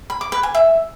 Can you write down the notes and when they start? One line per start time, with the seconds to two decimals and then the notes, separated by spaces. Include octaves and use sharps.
0.10 B5
0.21 D6
0.32 B4
0.43 G#5
0.55 E5